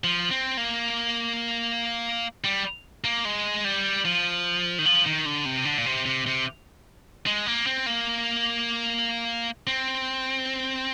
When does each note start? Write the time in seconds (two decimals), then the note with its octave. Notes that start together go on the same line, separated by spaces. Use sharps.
0.04 F3
0.31 C4
0.57 A#3
2.44 G3
3.04 A#3
3.25 G#3
3.65 G3
4.05 F3
4.79 D#3
4.85 F3
5.06 D#3
5.26 D3
5.45 C3
5.65 D3
5.78 A#2
5.86 C3
6.06 C3
6.26 C3
7.26 G#3
7.46 A#3
7.66 C4
7.86 A#3
9.67 C4